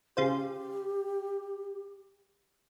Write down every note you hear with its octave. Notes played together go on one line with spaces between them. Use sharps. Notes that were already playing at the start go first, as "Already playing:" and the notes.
C#3 F4 G4 C5